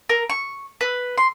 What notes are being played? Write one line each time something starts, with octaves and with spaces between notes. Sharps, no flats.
A#4
C#6
B4
C6